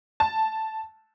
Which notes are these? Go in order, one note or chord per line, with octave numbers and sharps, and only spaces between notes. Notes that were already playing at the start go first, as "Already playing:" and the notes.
A5